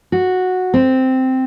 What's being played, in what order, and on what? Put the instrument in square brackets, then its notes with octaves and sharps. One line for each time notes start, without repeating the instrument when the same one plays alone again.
[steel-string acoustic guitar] F#4
C4